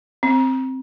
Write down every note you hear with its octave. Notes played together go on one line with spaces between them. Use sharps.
C4